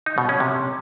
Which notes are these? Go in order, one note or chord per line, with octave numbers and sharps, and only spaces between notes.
D#4
B2
C#4
C3